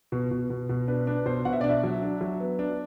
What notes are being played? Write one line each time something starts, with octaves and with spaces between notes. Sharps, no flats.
B2
B2
B2
B2
D4 B4
D4 B4
B2 C5
B2 F#5
E5
D4 D5
E5
F#3
D4
F#3
B3
D4